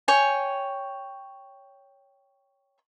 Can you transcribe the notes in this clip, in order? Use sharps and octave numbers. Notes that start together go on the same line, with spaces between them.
C#5 G5 G#5